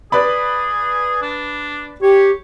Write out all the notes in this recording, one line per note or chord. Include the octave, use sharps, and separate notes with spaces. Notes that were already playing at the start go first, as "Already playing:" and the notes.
G#4 B4 D5 B5
D4
G4 C#5